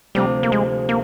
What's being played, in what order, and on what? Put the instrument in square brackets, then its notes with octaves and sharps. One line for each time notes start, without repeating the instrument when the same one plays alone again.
[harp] D2 C3 F3 [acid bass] G3
[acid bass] A#3
G#3
A#3